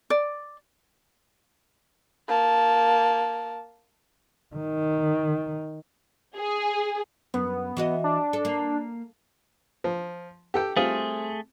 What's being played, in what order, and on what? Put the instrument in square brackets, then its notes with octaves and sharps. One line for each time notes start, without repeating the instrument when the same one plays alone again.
[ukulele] D5
[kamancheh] A#3 A5
[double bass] D#3
[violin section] G#4
[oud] F#2 [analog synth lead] B3
[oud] E3 F#4 D#5
[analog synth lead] D4
[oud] A4
A#3
[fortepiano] F3
G4 A4 G5
[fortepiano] G3 C4 F4 [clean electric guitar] A3 G#4